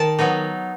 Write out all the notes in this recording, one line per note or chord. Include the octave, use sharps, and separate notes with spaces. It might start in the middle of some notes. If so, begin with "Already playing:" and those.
Already playing: D#3 A5
F#3 B3 D#4